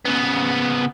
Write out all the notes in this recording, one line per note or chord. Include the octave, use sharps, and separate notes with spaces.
C#3 B3